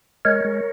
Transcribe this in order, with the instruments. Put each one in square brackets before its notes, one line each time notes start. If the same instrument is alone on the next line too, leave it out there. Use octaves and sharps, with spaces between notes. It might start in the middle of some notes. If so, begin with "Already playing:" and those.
[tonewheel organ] G#3 A#4 C#5
G#3